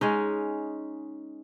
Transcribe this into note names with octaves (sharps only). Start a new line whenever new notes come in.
G#3 C#4 D#4